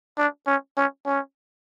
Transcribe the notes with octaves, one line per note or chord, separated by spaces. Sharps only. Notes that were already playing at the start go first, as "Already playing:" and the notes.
D4
C#4
C#4
C#4